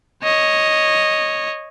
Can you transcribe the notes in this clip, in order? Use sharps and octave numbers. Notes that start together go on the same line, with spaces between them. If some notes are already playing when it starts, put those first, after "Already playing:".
C#5 D#5